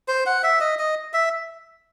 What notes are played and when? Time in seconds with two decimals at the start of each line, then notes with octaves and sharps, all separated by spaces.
0.08 C5
0.26 F#5
0.43 E5
0.60 D#5
0.79 D#5
1.13 E5